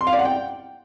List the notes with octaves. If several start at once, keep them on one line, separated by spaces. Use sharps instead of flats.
C6
F5
D5
F#5
G5